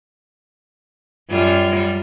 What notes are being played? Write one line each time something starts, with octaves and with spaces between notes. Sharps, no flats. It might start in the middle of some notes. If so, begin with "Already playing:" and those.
F#2 G3 F4